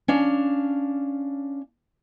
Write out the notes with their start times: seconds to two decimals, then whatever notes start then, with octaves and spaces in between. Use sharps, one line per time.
0.08 C#4 D4 F5